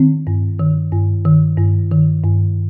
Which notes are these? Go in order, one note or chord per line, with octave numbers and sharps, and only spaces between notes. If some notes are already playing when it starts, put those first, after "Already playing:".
Already playing: D#3 C4
G2
D#3
G2
D#3
G2
D#3
G2